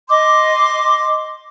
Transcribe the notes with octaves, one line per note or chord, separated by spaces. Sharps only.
D#5 C6 D6